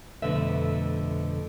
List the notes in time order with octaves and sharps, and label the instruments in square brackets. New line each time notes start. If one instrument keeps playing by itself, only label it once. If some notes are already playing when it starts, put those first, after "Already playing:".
[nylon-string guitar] F2 B2 D3 A3 B4 E5